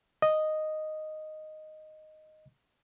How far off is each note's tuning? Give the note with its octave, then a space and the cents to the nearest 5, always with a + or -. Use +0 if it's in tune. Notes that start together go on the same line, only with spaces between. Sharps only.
D#5 -5